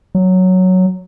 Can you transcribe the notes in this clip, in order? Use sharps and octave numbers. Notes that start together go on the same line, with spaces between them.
F#3